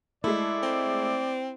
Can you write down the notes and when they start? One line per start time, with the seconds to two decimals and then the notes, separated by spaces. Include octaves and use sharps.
0.24 G#3 A3 E4 D5
0.63 C4